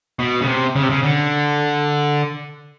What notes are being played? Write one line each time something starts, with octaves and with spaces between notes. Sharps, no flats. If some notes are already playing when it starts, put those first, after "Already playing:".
B2
C#3
C3
C#3
C3
C#3
D3